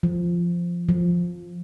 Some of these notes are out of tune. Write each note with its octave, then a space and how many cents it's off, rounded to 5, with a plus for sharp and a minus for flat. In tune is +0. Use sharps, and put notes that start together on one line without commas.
F3 -10
F3 +5